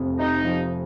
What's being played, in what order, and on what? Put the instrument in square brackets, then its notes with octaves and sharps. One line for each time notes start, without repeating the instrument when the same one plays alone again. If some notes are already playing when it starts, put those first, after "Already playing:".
Already playing: [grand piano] F1 F2
[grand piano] C3 [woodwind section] D#4
[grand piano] F3